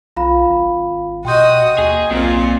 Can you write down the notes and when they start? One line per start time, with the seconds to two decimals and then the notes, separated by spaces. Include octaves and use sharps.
0.16 B1 F4 F5 B5
0.48 G#1
1.25 B2 F#4 D#5 G5 C6 G6
1.78 D#2 G#4
2.11 B1 A#2 C4 F4